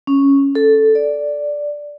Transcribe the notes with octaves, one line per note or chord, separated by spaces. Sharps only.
C#4
A4
D5